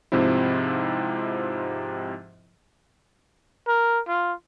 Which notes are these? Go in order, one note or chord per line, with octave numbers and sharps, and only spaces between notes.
G#2 C3 F3 C4 E4
A#4
F4